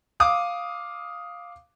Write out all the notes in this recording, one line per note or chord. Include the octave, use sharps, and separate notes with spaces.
F5 D6 D#6